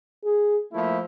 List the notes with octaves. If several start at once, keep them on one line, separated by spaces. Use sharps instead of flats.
G#4
F3 A3 A#3 E4